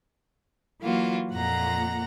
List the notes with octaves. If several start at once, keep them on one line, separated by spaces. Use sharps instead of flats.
E3 F#3 A#3 F4 F#4
F2 A#2 A#3 F#5 A#5 A#6